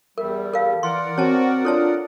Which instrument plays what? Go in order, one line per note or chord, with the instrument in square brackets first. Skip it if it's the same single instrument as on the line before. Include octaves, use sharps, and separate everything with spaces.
[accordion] E2 G3 [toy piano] A#4 [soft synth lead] E5
[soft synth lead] A4 [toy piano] A#4 F5
[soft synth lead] E3 [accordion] A#4 D5 F#5 [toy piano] C6
[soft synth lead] C4 [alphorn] F#4 [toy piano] C#5 A5
[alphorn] D4 [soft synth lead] F4 [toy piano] A4 C#5 A5